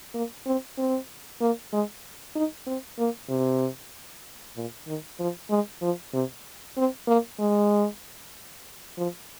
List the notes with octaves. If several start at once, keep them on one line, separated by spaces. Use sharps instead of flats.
A#3
C4
C4
A#3
G#3
D#4
C4
A#3
C3
A#2
D#3
F3
G#3
F3
C3
C4
A#3
G#3
F3